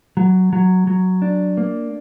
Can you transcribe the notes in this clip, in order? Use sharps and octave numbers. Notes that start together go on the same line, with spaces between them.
F#3
F#3
F#3
D4
A#3